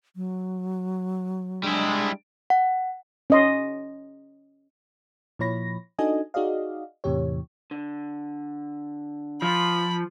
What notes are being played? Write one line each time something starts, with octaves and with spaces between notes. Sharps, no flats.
F#3
G3 G#3 D4 E4
F#5
C#4 D#5 C6
A#2 F3 E4 C#5 B5 A#6
D4 D#4 F#4 A4 D#5 G#5
D#4 F#4 G#4 D5 D#5 F5
E2 A2 C3 E3 G4 C#5
D3
F3 B5